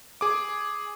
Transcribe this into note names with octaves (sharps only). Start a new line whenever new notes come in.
G#4 D6